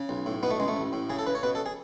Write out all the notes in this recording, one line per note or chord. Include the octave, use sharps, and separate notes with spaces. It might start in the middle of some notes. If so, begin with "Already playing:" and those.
Already playing: C#3
B1
A2
B2 B3
A3
C#2 G#3
A3
A1
A2
C#3 G#4
A4
C#3 B4
C#5
B2 B4
A4
G#4